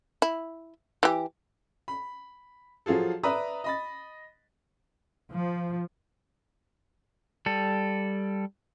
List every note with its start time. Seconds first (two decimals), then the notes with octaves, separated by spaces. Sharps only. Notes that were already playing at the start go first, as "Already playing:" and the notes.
0.22 E4
1.03 E3 G4
1.88 B5
2.86 F3 F#3 F4 G#4 A4
3.23 B4 D5 E5 A#5 B5 D#6
3.64 D#5 B5 A6
5.32 F3
7.46 G3 A4